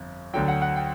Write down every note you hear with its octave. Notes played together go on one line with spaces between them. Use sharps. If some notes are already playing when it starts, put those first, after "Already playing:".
Already playing: G1 F2
D2 D3 F#3 G5
F#5
F#5
G5